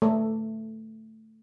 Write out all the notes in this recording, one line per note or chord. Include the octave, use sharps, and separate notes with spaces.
A3